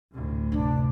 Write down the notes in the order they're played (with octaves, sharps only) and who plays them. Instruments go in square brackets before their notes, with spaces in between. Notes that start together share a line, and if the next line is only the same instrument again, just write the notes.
[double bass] D2 A2
[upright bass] F#2 C3 [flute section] D4